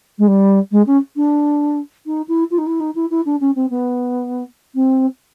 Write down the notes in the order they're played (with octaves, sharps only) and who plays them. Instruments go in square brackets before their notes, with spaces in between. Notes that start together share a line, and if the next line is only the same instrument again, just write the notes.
[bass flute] G#3
G3
G#3
C#4
D4
D#4
E4
F4
D#4
E4
D#4
E4
E4
D4
C#4
C4
B3
C4